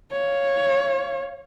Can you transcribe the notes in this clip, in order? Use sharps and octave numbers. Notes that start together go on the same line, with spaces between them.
C#5 F5